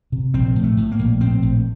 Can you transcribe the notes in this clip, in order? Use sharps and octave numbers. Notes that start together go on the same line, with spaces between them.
C3
A#1 C4
A2
A3
A2
A#3
A#1
A2 C4
A#1